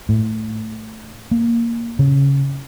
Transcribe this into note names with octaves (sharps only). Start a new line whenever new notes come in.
A2
A#3
C#3